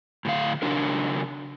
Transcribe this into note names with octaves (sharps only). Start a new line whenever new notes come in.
A2 D3 F5
C#3 F#3 D4 A#4